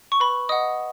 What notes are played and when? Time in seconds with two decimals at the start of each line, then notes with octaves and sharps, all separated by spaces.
0.12 C#6
0.20 B4 B5
0.49 D#5 F#5 D#6